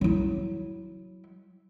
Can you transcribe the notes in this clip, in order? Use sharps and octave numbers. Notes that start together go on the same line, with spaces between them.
F#3 E4